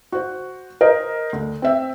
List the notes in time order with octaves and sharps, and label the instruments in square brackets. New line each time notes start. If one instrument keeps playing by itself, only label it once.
[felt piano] F#4 C5
A#4 C5 D#5
D2
C4 E5